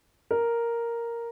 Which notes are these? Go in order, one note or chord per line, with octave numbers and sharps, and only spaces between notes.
A#4